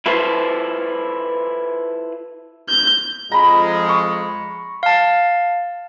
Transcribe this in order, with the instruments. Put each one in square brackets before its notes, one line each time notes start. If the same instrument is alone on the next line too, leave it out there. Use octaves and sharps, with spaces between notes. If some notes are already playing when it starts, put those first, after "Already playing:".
[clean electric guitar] E4 F4 A4 B4 C5
[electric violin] G6
[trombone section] F2 F3 G#3 [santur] A#5 B5
[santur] C#6
[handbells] F5 A5